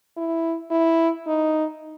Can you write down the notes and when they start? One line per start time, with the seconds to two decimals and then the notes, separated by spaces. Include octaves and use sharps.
0.17 E4
0.71 E4
1.27 D#4